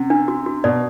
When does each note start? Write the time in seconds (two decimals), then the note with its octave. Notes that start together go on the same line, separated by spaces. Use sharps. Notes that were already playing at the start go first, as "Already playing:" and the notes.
Already playing: C3 C#4
0.10 D4
0.28 F#4
0.46 F#4
0.64 B2 D5